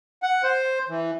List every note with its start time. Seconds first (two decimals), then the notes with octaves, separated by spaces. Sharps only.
0.23 F#5
0.43 C5
0.89 E3